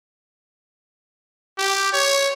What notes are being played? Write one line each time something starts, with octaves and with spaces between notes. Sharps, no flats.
G4
C#5